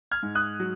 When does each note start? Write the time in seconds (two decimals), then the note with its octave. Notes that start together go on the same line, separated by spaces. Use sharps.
0.11 F6 G#6
0.23 G#2
0.35 D#6 F#6
0.60 F#3